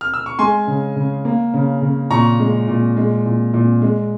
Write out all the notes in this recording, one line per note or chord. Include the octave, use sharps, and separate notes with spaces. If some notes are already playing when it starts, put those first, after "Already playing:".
F6
E6
C#6
G#3 G#5 C6
C#3
C#3
A#3
C#3
C#3
A#2 A#5 C#6
G#3
A#2
G#3
A#2
A#2
G#3